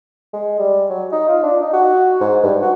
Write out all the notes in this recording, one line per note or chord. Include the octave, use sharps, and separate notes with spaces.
G#3
G3
F#3
D#4
F4
D4
D#4
F#4
G#2
G2
F#4